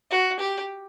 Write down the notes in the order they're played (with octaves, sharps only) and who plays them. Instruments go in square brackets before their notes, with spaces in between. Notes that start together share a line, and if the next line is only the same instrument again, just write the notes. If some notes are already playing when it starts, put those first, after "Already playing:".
[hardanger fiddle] F#4
G4